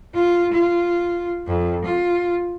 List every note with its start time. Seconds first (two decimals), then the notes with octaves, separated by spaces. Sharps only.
0.14 F4
0.52 F4
1.47 F2
1.85 F4